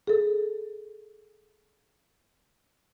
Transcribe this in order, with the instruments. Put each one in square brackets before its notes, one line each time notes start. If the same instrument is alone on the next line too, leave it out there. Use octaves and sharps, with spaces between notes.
[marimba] G#4 A4